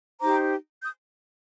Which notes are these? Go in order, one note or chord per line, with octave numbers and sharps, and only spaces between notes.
D#4 G4 C5 A#5 D6
D#6 G6